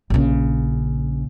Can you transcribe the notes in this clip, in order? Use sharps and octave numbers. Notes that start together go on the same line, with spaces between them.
A#1 C#3